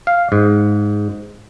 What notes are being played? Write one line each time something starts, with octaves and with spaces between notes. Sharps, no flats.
F5
G#2